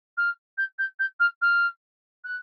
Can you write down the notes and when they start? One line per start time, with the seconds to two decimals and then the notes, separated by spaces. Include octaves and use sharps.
0.17 F6
0.58 G6
0.78 G6
0.99 G6
1.20 F6
1.41 F6
2.24 F#6